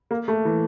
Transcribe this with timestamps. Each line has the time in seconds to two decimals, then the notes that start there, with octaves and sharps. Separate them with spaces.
0.11 A#3
0.28 A3
0.45 E3